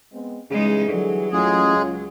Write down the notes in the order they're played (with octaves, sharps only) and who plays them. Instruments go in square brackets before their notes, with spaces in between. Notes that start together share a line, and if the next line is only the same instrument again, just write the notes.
[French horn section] G#3 B3 C4
[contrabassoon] C#3 [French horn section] E3 G3 G#4 [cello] G#3 D#4
[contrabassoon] D3 [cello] F#3
[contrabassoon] A1 [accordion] G#3 G#4 [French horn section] C#4 F4
[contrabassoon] C#2